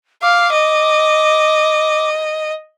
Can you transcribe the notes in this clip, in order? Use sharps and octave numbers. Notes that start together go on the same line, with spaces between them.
F5 D6
D#5